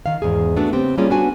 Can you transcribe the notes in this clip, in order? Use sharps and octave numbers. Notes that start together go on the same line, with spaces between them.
D#3 F5
E2 G#2 G#4
A3 B3 D4 F#4
C#3 C4 G4
G3 A#3 C#4 F4 G#4
B3 D4 F#4 B4 G#5